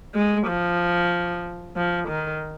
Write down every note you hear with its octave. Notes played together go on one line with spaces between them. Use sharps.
G#3
F3
F3
D#3